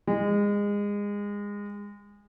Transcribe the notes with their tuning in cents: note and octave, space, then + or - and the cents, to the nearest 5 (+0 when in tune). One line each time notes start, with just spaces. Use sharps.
G#3 -25